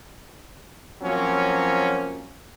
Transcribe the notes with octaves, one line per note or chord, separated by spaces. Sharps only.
F3 F#3 A#3 C4 C#4